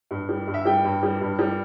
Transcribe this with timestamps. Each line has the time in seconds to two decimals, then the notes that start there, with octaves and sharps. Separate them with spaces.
0.11 G2
0.29 G3
0.47 G2
0.54 E5
0.65 G3 G5
0.84 G2
1.03 G3
1.22 G2
1.39 G3